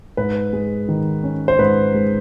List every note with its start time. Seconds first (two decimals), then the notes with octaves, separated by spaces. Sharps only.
0.17 G#2 B4
0.53 G#3
0.88 D#3
1.23 C#4
1.48 C5
1.59 G#2 B4
1.94 G#3